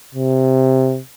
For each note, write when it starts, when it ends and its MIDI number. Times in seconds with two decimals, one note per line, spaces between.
0.15 0.99 48